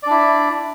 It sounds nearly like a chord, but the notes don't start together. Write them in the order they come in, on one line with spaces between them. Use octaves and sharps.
D5 D4 E4